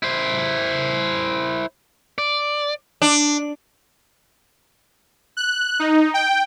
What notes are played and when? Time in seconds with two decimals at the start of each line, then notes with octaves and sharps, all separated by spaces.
0.03 E4 C5
2.18 D5
3.02 D4
5.37 F#6
5.79 D#4
6.14 G5